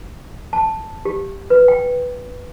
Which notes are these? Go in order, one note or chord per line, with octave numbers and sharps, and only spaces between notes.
A5
G4
B4
G5